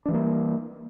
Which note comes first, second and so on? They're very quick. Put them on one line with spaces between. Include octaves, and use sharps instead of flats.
D4 E3 G3 A#3